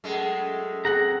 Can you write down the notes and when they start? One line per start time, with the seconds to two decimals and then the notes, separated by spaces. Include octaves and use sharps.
0.04 F#2 G#3 A3
0.85 C4 G#4 F#5 A#5 A#6